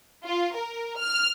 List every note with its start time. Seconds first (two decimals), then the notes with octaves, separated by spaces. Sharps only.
0.23 F4
0.55 A#4
0.98 F6